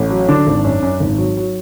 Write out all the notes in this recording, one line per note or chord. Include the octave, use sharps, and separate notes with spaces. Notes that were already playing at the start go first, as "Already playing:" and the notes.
Already playing: A1
F#3
D3 D4
G#1
F#2
F#2
G#1
F#3
F#3